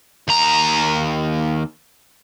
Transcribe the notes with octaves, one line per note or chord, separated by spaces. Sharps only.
D#2 A#5